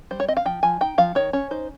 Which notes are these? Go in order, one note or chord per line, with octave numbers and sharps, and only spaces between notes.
G3 C5
C#5
C4 D#5
F5
F3 G5
F3 G#5
D#4 G5
F3 F5
D#3 C#5
C#4 C#5
D#4 C5